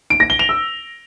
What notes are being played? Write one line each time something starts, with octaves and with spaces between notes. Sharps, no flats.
D7
A#6
G7
F7
E6